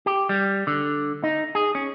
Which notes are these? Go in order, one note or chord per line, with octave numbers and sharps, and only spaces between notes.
G4
G3
D3
D#4
G#4
C#4